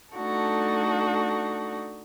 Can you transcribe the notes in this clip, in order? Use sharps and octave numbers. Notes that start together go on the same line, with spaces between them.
A3 D4 D#4 F#4 A4